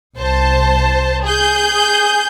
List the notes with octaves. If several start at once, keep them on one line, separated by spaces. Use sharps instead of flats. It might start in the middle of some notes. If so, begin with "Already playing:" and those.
C2 C5 A5
G#4 G6